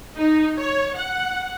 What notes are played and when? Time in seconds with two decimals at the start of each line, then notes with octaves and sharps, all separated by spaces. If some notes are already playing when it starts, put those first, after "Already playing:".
0.17 D#4
0.58 C#5
0.96 F#5